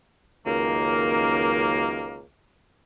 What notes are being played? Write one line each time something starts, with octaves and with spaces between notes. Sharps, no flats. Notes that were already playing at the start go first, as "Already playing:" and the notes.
C#2 F#2 D#3 A#3